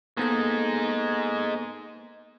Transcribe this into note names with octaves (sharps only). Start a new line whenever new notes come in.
G#3 A#3 B3 D#4 A4